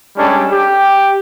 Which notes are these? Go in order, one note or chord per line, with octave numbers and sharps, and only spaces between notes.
G3 G#3 C#4 D4 A4
G4